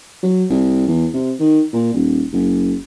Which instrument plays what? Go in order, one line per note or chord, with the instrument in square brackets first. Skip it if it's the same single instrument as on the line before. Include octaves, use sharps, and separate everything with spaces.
[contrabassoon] F#3
C2
E2
C3
D#3
A#2
D#1
F#1